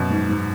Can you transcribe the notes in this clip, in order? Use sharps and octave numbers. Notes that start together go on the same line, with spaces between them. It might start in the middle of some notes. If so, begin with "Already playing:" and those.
Already playing: F#2 B2
G#2
G#2